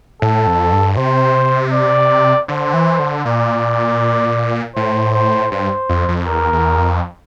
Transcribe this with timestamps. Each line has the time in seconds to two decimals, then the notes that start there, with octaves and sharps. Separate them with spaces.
0.22 A2 A4
0.47 F2
0.72 G2
0.97 C3 C5
1.73 D5
2.48 D3 C5
2.74 E3
2.99 D3
3.25 A#2 D5
4.75 A2 C5
5.14 C5
5.51 G2 C5
5.89 F2
6.08 F2
6.27 E2 A#4
6.52 E2
6.78 F2